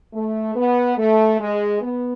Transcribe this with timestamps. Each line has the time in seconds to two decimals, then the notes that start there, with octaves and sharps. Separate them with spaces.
0.13 A3
0.55 B3
0.97 A3
1.39 G#3
1.81 B3